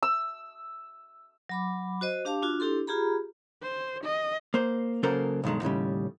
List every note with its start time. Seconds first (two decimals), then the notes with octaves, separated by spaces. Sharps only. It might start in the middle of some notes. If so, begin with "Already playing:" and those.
0.03 E6
1.49 F#3 B5 D6
2.01 F#4 C5 D#5
2.25 D4 G4 F5 A5 D6
2.42 D4 F4 F#4
2.60 D4 E4 G4 A4 C6
2.87 F4 G4 G#4 A#5 B5
3.62 C5
4.03 D#5
4.54 A#3 C5
5.03 C#3 F#3 A#3 A4 A#4 C5
5.44 B1 G2 D#3 G#3
5.62 D#2 A2 C#3 G3